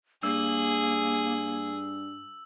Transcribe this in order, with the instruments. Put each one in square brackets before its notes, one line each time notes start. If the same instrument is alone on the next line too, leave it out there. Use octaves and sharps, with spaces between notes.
[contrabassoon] G2 [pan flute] A#3 [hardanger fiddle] G#4 [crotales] E6